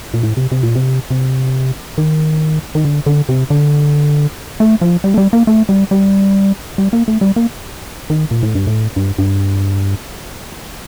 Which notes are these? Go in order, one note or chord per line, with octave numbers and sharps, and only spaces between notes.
A#2
A2
C3
C3
A#2
C3
C3
D#3
D#3
D3
D3
C3
D3
A3
F3
G3
A3
G3
A#3
A3
G3
G3
G3
A#3
A3
G3
A#3
D#3
A#2
A2
G2
A2
G2
G2